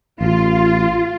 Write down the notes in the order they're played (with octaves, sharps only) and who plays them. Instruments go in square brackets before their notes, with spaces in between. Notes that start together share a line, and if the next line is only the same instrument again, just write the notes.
[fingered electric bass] A1 [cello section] F4